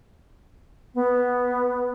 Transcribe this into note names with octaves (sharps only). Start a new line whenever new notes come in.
B3